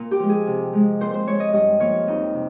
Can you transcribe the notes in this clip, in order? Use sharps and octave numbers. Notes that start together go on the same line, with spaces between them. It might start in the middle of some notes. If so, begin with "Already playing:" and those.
Already playing: A#2
G4
F3 G#3
G#4
C3
F3 G#3
A#2 C5
C5
G#3 C#5
D#5
G2 D#5
F3 A#3 C#5
F2 D#4
C3